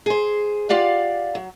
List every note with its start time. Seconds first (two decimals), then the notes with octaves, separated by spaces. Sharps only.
0.06 G#4 C5
0.69 F4 G4 D5 F5 F#5
1.35 F#3